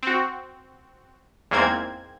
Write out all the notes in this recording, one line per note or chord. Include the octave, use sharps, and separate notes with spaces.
C4 F#4
E2 G#2 A#3 C4 G#6